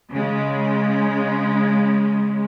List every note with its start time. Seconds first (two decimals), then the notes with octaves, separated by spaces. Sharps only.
0.11 C#3 G#3